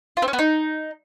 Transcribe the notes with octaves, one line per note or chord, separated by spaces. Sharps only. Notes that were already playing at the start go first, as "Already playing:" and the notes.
F4
C4
C#4
B3
D#4